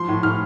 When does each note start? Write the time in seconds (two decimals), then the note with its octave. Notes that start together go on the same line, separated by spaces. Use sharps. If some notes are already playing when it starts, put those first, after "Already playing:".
Already playing: F3 C6
0.08 A2
0.23 A2 F6